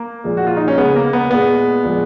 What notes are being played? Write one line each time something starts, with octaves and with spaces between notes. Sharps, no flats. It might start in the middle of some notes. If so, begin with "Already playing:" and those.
Already playing: A#3
A#2 F3 G#3
F#4
F4
D#4
C#4
C#3 G#3 B3
A#3
B3
A#2 G#3 B3
A#2 F3 G#3